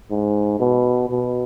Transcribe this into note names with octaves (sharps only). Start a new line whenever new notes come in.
G#2
B2
B2